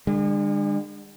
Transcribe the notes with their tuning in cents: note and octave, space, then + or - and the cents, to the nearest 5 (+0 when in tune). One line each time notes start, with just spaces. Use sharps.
D3 +30 G#3 -40